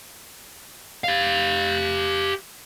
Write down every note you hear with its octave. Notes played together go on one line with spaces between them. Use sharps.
G4 F5